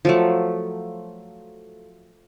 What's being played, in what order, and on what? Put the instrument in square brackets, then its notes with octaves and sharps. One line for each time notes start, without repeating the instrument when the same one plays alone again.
[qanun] F3 F#3 A3